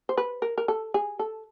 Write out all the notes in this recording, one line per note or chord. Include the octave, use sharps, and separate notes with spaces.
C5
B4
A#4
A#4
A4
G#4
A4